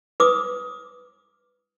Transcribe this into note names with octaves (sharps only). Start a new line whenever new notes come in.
B4 D6 D#6